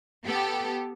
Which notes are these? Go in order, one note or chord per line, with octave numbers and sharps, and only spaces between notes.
B3 G4 A4